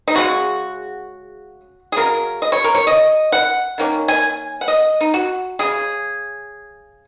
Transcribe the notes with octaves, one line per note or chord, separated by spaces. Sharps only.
D#4
C#3 G#3 C#4 F#4
G#4
C#3 F#3 C#4 A#4
D#5
C#5
A#4
C#5
D#5
F#5
D#3 A#3 C#4
G#5
F#5
D#5
D#4
F#4
C#3 G#3 C#4 G#4